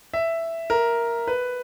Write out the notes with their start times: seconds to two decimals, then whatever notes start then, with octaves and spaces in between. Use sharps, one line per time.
0.14 E5
0.70 A#4
1.27 B4